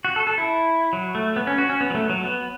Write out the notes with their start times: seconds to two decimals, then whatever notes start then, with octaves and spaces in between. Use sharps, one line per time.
0.05 F#4
0.16 A4
0.27 A4
0.38 E4
0.93 F#3
1.15 A3
1.36 B3
1.47 C#4
1.58 F#4
1.69 C#4
1.81 B3
1.90 F#3
1.95 A3
2.10 F#3
2.24 B3